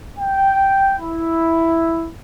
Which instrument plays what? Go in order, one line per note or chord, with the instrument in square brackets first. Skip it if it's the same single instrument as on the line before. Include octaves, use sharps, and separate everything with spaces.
[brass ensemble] G5
E4